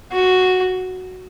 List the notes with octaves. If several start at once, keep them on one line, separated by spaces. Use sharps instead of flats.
F#4